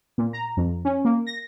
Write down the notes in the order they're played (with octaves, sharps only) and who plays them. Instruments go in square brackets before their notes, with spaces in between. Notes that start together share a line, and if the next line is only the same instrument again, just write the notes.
[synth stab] A#2
A#5
F2
C#4
A#3
A#6